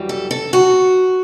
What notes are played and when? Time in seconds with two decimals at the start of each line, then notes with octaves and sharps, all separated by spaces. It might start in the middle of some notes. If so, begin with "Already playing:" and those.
Already playing: F#2 E3 G3
0.09 A4
0.31 A4
0.53 F#4